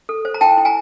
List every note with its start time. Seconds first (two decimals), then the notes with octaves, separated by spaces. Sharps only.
0.09 A4
0.25 C5
0.34 A#5
0.41 E4 G5 A5
0.58 E4
0.65 G#5 A#5